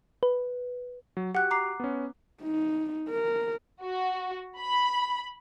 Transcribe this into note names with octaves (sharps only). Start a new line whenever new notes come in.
B4
F#3
F#4 G4 F#5 F#6
A#5 D6 C7
B3 C#4
D#4
A#4
F#4
B5